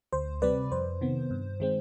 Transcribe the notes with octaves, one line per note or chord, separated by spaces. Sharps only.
D2 C5
C3 G3 C4 B4 D5
F2 C5
C3 D#3 B3
G2
D#3 G#3 C4